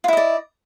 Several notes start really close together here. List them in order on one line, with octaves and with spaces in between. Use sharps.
F4 E4 D#5 D5